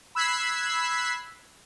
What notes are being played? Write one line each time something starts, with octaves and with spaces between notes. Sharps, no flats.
B5 E6 F#6 G#6 B6 C7